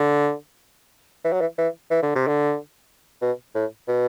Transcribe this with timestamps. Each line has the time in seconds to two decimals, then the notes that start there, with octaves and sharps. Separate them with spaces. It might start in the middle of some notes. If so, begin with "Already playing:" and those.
Already playing: D3
1.24 E3
1.32 F#3
1.41 E3
1.58 E3
1.91 E3
2.02 D3
2.15 C3
2.28 D3
3.22 B2
3.55 A2
3.88 B2